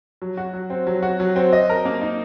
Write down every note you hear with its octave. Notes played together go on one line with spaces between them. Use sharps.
F#3
F#4
F#3
C4
F#3
F#4
F#3
C4
D#5
A#4
A#3
D#4